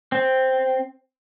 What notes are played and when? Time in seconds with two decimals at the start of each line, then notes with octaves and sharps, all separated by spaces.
0.12 C4